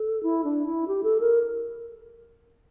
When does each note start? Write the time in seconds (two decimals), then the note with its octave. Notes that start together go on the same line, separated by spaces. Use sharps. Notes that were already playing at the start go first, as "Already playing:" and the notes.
Already playing: A4
0.23 E4
0.44 D4
0.66 E4
0.88 G4
1.03 A4
1.20 A#4